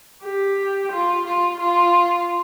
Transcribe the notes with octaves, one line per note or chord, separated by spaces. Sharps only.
G4
F4
F4
F4